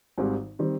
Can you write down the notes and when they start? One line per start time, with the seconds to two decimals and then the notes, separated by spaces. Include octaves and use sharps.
0.18 G#1 G#2 D#3 G3 C4
0.59 D#3 G3 C4